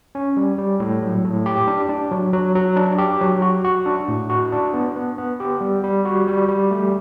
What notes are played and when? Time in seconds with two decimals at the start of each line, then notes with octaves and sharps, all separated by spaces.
0.15 C#4
0.37 G3
0.58 G3
0.80 A2
1.02 F#3
1.25 A2
1.46 G4
1.68 D4
1.89 D4
2.12 F#3
2.33 F#3
2.55 F#3
2.77 D4
2.98 G4
3.21 F#3
3.42 F#4
3.65 F#4
3.86 D4
4.08 A2
4.30 F#4
4.52 D4
4.74 B3
4.96 B3
5.18 B3
5.40 G4
5.61 G3
5.83 G3
6.05 F#4
6.27 G3
6.48 G3
6.71 A3